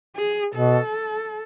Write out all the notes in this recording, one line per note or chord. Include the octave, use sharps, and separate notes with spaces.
G#4
B2 A4